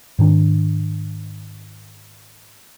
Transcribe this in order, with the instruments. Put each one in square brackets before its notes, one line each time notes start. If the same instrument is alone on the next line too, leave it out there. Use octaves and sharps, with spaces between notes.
[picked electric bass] G#2 D#3 D4